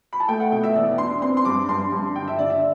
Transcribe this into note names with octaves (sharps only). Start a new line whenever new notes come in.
B5
A5
A3 G5
F#5
B2 G5
E5
E2 D5
D4 C6
C4 C6
C6
G2 D6
G2 C6
G2
D3 G5
E5
D3 D5
E5